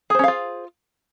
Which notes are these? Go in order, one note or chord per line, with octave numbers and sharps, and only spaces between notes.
C#4 F4 G#4 C5 F5